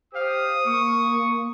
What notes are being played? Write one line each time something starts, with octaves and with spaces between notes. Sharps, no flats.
G4 C5 F5 D#6
A#3 C#6